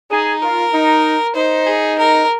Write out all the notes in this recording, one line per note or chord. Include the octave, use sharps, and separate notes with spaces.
D#4 G#4
F4 A#4
D#4
D#4 C5
G#4
A#4